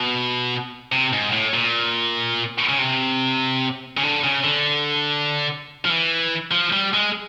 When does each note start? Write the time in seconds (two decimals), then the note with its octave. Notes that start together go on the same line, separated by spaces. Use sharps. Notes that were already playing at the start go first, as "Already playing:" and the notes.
Already playing: B2
0.92 C3
1.13 G#2
1.32 A2
1.54 A#2
2.69 C#3
2.78 C3
3.97 C#3
4.03 D3
4.24 C#3
4.44 D3
5.85 F3
5.90 E3
6.51 F3
6.73 G3
6.93 G#3